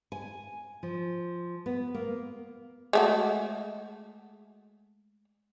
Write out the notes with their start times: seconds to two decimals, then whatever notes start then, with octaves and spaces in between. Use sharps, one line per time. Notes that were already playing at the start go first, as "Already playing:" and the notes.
0.12 G#5
0.83 F3
1.66 B3
1.94 A#3
2.93 G#3 A3 F#4